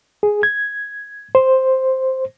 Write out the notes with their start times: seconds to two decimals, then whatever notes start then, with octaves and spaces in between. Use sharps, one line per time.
0.23 G#4
0.43 G#6
1.35 C5